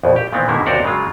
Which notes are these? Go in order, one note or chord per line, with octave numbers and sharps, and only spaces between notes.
A#1 F2 B2
G4
A#2 D#3 E3 B3 C4
B2 D3 D#3 G#3 A#3 E4
D#2 C3 F#4 A#4 C5 D5
C#3 F#3 G#3 F4